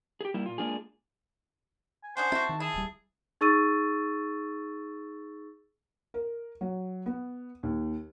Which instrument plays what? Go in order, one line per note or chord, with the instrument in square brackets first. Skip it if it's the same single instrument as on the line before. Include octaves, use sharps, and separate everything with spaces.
[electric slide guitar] G4 G#4
G3 A#3 E4
A#2 F4
G#3 A#3 D4 F4 G#4
[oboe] G#5
[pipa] C#4 D4 G#4 [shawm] C5 [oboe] F#5
[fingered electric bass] C4 [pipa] E4 F#4 [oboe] A5
[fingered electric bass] D#3
[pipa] E4 [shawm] G#4 [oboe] A5
[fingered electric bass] D1 G3
[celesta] D#4 G#4 C#6 E6 A6 D#7
[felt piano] A#4
F#3
B3
D#2